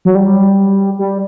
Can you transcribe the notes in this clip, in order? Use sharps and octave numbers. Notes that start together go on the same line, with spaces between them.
F#3
G3
G3